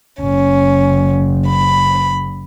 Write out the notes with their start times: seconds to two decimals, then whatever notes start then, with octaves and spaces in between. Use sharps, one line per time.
0.21 F#1 C#4
1.48 B5